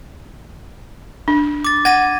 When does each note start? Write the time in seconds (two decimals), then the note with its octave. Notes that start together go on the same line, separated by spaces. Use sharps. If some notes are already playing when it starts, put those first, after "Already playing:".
1.28 D4
1.64 D6 A6
1.85 F#5 G#6 A#6 D#7